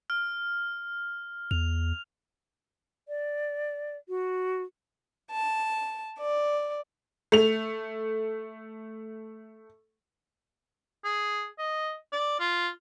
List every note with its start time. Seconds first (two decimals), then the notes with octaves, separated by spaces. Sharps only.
0.10 F6
1.51 E2 F7
3.08 D5
4.09 F#4
5.31 A5
6.19 D5
7.32 A3 F7
11.04 G#4
11.59 D#5
12.12 D5
12.39 F4